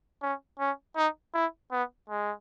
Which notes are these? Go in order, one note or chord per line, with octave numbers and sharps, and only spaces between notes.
C#4
C#4
D#4
E4
B3
G#3